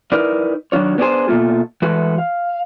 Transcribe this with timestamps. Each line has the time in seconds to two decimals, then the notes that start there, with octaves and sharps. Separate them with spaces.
0.12 D#4 E4 A#4 B4 D5
0.72 D#3 F#3 D4 F4 C#5
0.98 B3 C#4 D4 G4 G#4 C5
1.28 B2 E3 A3 A#3 F4
1.82 E3 G#3 A3 F#4 B4
2.18 F5